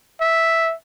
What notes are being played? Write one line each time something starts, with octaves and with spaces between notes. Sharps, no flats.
E5